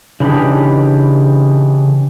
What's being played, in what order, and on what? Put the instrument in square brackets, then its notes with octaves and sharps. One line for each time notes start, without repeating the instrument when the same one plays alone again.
[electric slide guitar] C#3 E3 D4 D#4 G4